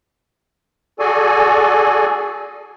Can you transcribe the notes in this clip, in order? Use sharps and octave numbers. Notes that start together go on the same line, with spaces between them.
F#4 G#4 A4 D5 G#5